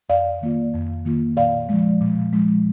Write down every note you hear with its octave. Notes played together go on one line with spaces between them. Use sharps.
F2 D5 F5
D#3 A#3 F4
F2
D#3 A#3 F4
A#2 D5 F5
F3 G#3
A#2
F3 G#3